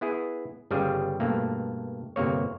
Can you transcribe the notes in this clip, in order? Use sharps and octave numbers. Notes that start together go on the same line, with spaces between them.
B3 E4 G#4
G1 C#3 G3 G#4 F5
G2 B2 A3 A#3
G1 C3 A#3 C#5